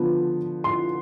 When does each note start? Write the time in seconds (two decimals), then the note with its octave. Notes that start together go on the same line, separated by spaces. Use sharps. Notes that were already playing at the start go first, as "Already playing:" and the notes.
Already playing: D3 F3 B3
0.64 C6